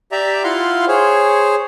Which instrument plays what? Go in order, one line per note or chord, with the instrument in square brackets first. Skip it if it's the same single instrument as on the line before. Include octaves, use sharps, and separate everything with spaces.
[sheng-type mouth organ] G4 D5 E5 A#5
E4 F4 F5 F#5 C6
G#4 C5 C#5